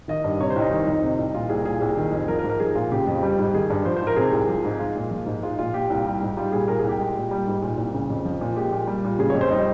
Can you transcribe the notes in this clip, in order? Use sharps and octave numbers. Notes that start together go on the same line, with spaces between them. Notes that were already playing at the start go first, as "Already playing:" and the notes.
D#3 D#5
G2
C3 C#5
C5
C2 D#4
D#3
F2
C3
C2
A#2 F4
C2 G#4
A#2 G#4
C2
D#3
F2
F3 A#4
A#4
G#2
A#4
F3 G#4
A#2 F4
C#3 G4
F2
G3
G#2
D#3 G#4
G2
F3 C5
C5
G#2
A#4
C3 G#4
C2
F3
G#2
G#3 F4
A#2
F3
G#2
G#3 F4
A#2 F4
A#2 G4
C2
G3
G#2
G3 F4
A#2 G#4
A#2 A#4
C2 G#4
G4
G#3
A#2
G3
G#2
A#2
C2
C#3
F2
F3
A#2
G#3 G4
A#2
G3
A#2
C#3 G#4
F2 C#5
C5
G3 D#4